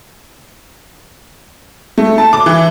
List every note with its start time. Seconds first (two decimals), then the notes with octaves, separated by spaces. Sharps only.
1.98 A3
2.18 A5
2.33 D6
2.46 E3